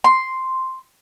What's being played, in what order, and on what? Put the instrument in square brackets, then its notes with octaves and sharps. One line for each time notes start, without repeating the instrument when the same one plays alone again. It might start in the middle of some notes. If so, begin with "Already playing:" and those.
[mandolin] C6